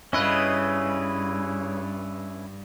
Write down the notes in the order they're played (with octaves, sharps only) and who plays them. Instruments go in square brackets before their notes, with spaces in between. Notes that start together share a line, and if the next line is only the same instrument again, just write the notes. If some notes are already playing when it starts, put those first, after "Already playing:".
[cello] G2 [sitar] C#3 D#5 [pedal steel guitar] C#4 E4 B4